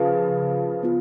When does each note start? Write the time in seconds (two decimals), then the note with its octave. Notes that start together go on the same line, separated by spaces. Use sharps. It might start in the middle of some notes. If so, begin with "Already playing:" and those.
Already playing: C#3 F3 G#4 B4 F5
0.83 B3 F4